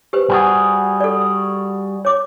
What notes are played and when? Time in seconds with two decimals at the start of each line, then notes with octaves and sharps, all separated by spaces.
0.13 G4 B4 C5
0.30 G3 F#4 G#4
1.00 A4 D5
2.05 C#5 D6